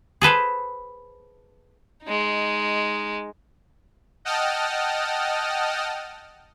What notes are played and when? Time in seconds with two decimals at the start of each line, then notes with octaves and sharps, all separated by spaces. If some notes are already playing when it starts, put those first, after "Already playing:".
0.21 G#4 A4 B4 C5
2.03 G#3 D#4
4.25 D#5 F#5 G5 A5 D#6 F6